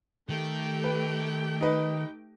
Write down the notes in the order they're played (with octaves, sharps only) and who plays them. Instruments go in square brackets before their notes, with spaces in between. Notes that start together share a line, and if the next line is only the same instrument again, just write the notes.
[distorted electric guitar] D#3 [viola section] A3 G4 G5
[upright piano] B4
D#4 B4 D#5